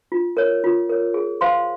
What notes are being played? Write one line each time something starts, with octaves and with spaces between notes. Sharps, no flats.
F4
A#4 C#5
F4
A#4 C#5
G#4
C5 F5 C6